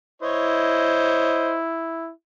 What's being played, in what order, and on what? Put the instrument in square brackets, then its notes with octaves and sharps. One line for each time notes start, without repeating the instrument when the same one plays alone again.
[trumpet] E4 [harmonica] C5 C#5 D#5